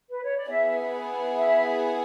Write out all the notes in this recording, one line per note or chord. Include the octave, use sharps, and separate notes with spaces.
B4
C#5
D5
B3 E4 G#4 E5
E5